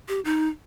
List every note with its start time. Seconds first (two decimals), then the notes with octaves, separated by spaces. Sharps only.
0.08 G4
0.25 D#4